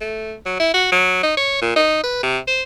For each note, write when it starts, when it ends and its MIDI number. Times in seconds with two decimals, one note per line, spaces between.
0.01 0.34 57
0.45 0.59 54
0.60 0.71 64
0.74 0.88 66
0.92 1.21 54
1.23 1.33 63
1.37 1.58 73
1.61 1.74 46
1.76 2.02 63
2.03 2.23 71
2.23 2.38 48
2.47 2.62 72